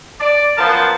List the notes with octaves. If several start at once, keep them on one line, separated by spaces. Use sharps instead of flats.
D5
F#2 F3 B3 A#4 C5 A5